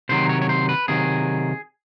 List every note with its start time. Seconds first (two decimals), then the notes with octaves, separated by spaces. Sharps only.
0.09 C3 D#3 F#3 C5
0.29 C#5
0.42 C#5
0.49 C5
0.69 B4
0.88 C3 D#3 F#3 G#4